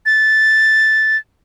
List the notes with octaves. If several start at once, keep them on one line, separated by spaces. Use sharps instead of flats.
A6